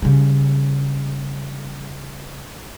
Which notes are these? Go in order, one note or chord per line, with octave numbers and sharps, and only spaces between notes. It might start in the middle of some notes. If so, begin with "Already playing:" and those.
C#3 G3